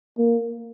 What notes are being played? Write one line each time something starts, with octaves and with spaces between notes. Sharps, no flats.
A#3